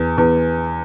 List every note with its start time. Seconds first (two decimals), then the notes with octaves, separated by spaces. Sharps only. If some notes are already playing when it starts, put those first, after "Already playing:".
Already playing: E2
0.18 E2